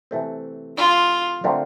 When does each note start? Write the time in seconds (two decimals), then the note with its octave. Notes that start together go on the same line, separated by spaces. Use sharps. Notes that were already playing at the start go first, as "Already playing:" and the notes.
0.11 C3 E3 A3 C4
0.77 F4
1.44 D3 A3 C4 F4 A#4